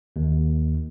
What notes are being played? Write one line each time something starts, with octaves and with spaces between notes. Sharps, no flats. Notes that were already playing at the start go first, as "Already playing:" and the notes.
D#2